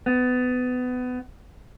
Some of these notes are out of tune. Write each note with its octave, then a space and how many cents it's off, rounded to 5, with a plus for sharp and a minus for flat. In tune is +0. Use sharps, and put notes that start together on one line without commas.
B3 +25